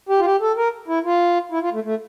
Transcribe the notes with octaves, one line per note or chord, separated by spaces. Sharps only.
G4
F4
G4
A4
A#4
E4
F4
E4
F4
A3
A3